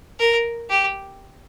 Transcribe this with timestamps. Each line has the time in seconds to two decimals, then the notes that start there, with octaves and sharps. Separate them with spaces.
0.19 A#4
0.70 G4